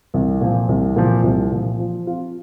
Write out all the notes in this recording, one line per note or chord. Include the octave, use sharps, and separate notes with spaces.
C2
A#2 F3
C2
A#2 F3
C2
A#2 F3
F3
C4 F4